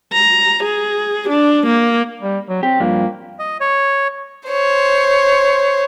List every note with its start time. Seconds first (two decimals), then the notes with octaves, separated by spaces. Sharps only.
0.13 A#5
0.64 G#4
1.29 D4
1.67 A#3
2.22 G3
2.49 F#3
2.63 C4 G4
2.80 G2 F3 A#3 D4
3.39 D#5
3.60 C#5
4.49 C5 C#5